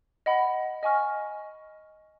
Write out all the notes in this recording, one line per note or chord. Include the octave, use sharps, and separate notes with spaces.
D#5 F#5 B5
D#5 G#5 C#6 F6